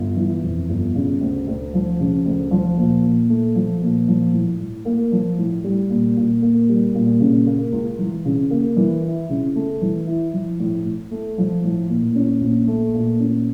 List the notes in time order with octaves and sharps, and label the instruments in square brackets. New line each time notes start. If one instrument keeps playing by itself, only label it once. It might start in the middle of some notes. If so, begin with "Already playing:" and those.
Already playing: [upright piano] G1
E3
F2
G1
C#3
D2
D2
F3
C#3
D2
F3
A#2
A#2
A3
F3
A#2
F3
A2
A2
A#3
F3
A2
G3
A#2
A#2
A#3
G3
A#2
C#3
A#3
C#2
E3
C#3
A#3
E3
E4
C#3
A3
E3
E4
F3
A2
A2
A3
F3
A2
A#2
C#4
A#1
A3
A#2
C#4